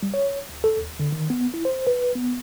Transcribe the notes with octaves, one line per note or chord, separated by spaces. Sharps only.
G3
C#5
D2
A4
D#2
D3
D#3
B3
E4
C5
B4
B3